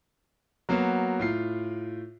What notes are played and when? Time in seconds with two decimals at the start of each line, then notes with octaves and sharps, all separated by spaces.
0.69 F#3 A#3 B3 F#4
1.19 A2 F4 C7